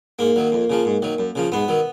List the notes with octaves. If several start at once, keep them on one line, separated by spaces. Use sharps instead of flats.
G#2 A#3
D#3 F#3
F2
C#3 F3
G#2
D#3 F#3
F#2
C#3 F3
G#2 B3
D#3 F#3